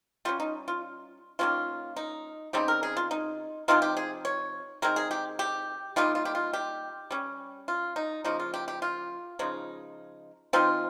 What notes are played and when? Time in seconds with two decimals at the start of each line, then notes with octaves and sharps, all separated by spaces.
0.25 G3 C#4 F4
0.40 D#4
0.68 F4
1.39 D#3 G3 A#3 C#4 F4
1.96 D#4
2.53 C#3 G3 C4 D#4 G4
2.68 A#4
2.83 G#4
2.97 F4
3.11 D#4
3.68 C3 F3 C4 D#4 F4
3.82 G4
3.97 G#4
4.25 C#5
4.82 D#3 G#3 C4 A#4
4.96 G#4
5.11 G4
5.39 G4
5.96 G3 A#3 D#4 F4
6.15 F4
6.25 G4
6.35 F4
6.53 G4
7.11 G3 C#4
7.68 F4
7.96 D#4
8.24 C#3 F3 A#3 D#4
8.40 F4
8.54 G4
8.68 G4
8.82 F4
9.39 C#3 F3 G#3 D#4
10.53 F3 C4 D#4 F4